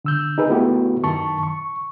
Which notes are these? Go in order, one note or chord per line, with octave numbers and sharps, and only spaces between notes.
D3 E6 G6
D#4 G#4 B4
A3 B3 E4 F#4 G4
F#2 D#3 A5 C#6
C#6